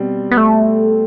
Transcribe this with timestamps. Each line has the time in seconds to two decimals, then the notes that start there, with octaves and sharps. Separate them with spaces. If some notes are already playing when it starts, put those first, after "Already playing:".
Already playing: B2 G3 C4
0.31 B3
0.37 A3